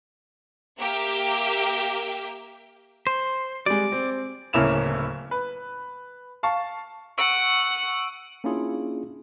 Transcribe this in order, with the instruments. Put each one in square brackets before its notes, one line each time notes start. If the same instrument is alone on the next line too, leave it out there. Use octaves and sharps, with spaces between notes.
[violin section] A#3 G4 A#4 E5 G5
[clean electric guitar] C5
[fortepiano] G3 G#3 [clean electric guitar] D5
[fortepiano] C4
[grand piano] D1 C#3 A#3 E4 E7 F7
B4
F5 A5 C#6
[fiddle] F#5 [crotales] C#6 E6 D7
[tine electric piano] A#3 C#4 D4 E4 F4 G#4